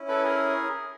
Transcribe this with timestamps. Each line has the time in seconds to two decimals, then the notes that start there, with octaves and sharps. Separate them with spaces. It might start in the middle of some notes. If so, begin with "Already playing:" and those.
Already playing: C#4 E4
0.08 A4 B4
0.24 G#4 A#4